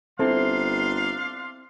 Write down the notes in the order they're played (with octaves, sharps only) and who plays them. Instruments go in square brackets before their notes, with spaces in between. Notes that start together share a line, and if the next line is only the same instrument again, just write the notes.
[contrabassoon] G1 [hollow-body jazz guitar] C4 E4 A4 [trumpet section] D4 F5 C6